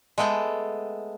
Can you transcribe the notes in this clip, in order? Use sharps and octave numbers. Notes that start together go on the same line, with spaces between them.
G#3 A3 B3 A4 G5